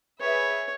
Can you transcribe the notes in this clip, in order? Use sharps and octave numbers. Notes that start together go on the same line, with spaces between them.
G#4 B4 C#5 E5